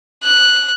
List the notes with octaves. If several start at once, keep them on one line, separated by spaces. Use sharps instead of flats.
F#6